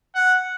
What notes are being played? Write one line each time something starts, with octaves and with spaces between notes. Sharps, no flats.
F#5